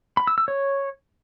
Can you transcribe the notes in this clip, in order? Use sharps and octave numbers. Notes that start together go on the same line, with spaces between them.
B5
E6
E6
C#5